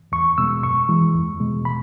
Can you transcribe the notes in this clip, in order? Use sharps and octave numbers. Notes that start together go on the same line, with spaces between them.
E2 C#6
B2 G#3 E6
F#2 C#6
E3 G#3
E2
B2 G#3
B5